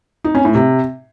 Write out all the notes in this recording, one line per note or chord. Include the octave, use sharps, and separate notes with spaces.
D#4
C#4
A2
C3